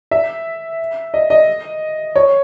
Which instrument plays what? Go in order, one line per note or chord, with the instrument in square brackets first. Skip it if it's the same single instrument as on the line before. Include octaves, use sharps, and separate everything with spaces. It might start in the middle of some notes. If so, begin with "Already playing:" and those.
[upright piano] E5
D#5
D#5
C#5